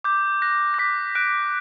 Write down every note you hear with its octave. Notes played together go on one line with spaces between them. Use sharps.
D6 G6
F#6 A#6
A#6
D6 B6
F#6 D7